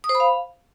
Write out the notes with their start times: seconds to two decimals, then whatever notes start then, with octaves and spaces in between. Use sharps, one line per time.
0.04 D#6
0.09 C5
0.15 B5
0.20 F5